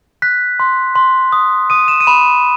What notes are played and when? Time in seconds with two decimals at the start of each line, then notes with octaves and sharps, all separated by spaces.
0.22 F#6 B6
0.60 C6
0.96 C6
1.32 D#6
1.70 D#6 D#7
1.88 E7
2.00 D#7
2.07 B5 E7